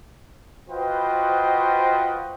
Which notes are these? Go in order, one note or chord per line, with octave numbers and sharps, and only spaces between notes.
F4 F#4 B4 C5 D#5 G5